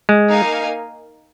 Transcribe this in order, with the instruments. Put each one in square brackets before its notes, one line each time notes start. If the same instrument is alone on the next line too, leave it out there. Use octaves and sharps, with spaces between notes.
[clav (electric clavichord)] G#3
[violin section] A#3 D#4 A#4 F5 G#5